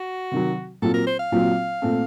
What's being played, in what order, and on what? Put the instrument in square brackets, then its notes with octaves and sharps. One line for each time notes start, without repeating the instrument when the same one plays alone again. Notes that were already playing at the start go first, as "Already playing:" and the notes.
Already playing: [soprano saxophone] F#4
[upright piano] C3 D#3 F#3
[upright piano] A#2 F#3 C4 F4 [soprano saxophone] A4
[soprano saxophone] A#4
C5
F5
[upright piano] A#2 F#3 C4 F4
A#2 A3 C4